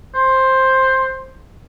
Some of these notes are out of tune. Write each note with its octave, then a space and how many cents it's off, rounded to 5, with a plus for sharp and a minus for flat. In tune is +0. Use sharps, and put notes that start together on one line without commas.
C5 +10